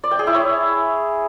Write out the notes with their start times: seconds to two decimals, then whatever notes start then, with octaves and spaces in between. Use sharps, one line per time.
0.04 D5
0.11 G5
0.19 G#4
0.27 E4
0.35 C#5